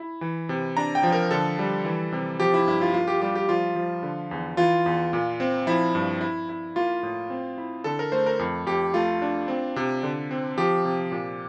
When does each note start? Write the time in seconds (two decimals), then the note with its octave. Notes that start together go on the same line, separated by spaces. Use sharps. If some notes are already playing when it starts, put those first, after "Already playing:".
Already playing: E4
0.21 E3
0.49 C3
0.77 D4 A#5
0.95 G5
1.03 F3
1.12 A#4
1.31 D3 A4
1.59 G3
1.85 E3
2.12 C3
2.39 F3 G4
2.54 E4
2.67 G2 E4
2.81 F4
2.94 A#3 F4
3.07 G4
3.21 G3 G4
3.35 G4
3.49 F3 F4
3.76 F3
4.03 D3
4.31 E2
4.57 E3 F4
4.86 E2
5.13 A#2
5.40 C4
5.67 F3 E4
5.95 G2
6.21 E4
6.49 E4
6.76 A#3 F4
7.03 A2
7.30 C4
7.58 E4
7.84 D3 A4
7.99 A#4
8.12 A3 C5
8.26 A#4
8.39 F2
8.66 F2 G4
8.94 A3 F4
9.22 D4
9.48 C4
9.76 C3
10.03 D3
10.31 C4
10.58 F3 G4
10.85 C3
11.12 A#2